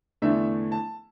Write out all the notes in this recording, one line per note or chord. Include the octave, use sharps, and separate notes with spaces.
E2 D3 A3 D4 E5
A5